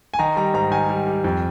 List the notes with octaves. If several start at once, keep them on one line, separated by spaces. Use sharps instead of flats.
G#5
D#3 A#5
G3 A#5
G#2 A#5
D#3 G#5
G3
G3
F2